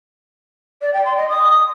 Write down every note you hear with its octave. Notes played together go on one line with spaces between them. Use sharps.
D5
G5
C6
D#5
D#6